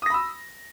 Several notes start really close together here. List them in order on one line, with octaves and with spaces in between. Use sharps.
D#6 A#6 B5 E6